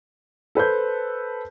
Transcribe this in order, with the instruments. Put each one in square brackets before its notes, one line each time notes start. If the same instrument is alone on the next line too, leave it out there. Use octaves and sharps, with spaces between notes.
[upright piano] A4 B4 C5 G6